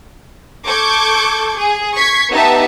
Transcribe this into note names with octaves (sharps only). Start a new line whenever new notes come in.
A4 C#6 D6 G6 G#6
G#4
C#6 G#6 B6 C7
B3 D#4 G4 E5 F#5 A5